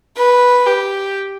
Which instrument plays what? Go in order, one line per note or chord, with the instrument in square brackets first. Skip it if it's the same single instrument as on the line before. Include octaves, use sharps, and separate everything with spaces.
[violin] B4
G4